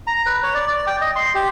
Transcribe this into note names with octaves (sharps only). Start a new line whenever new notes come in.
A#5
B4
C#5
D5
D5
G5
D#5
C6
G4